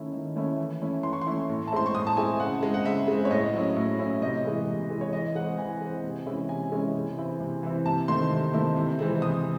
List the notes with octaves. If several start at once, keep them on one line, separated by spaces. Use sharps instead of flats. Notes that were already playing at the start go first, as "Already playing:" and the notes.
Already playing: D#3 A3 C#4 E4
D#3
A3 C#4 E4
E3
A3 C#4 E4
E3 C6
C#6
C6
A3 C#4 E4
A2
A5
G#3 C4 E4 C6
C#6
A2 D#6
A5
G#3 C4 E4 G#5
C#3 F#5
G#3 C4
F#5
C#3 E5
G#3 C4
C#5
A2 D#5
F#3 C#4 E4
A2
F#3 C#4 E4
C3 D#5
E3 G#3
C3
E3 G#3
C#5
E3 D#5
G#3 C4 F#5
E3 G#5
G#3 C4
C3
E3 G#3 C#4 E4
C3 G#5
E3 G#3 C#4 E4
C3
E3 C4 E4
C3
E3 C4 E4
C3 A5
D#3 A3 C4 E4 C6
C3
D#3 A3 C4 E4
C3
E3 G#3 C4
C3 D#6